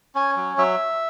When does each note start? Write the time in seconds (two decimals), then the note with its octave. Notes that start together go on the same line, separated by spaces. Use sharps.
0.15 C#4 G#5
0.37 F#3
0.58 F#3 E5